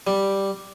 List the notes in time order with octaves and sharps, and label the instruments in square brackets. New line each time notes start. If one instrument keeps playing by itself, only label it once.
[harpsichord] G3